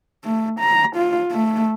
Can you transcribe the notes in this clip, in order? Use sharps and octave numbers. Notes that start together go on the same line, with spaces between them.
A3
A#5
F4
A3